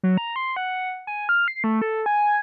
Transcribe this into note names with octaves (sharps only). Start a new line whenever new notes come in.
F#3
A#5
C6
F#5
G#5
F6
C7
A3
A4
G#5